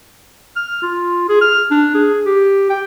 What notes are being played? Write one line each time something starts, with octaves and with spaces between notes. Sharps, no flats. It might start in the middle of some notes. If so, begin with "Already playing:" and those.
F6
F4
G#4
F6
D4
G#4
G4
G5